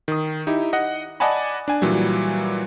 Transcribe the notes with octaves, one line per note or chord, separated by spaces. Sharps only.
D#3 D#6
D#4 E4 G4
D#5 F#5
D5 D#5 F#5 G#5 A5 B5
D4 G#5
A#2 E3 F#3 G3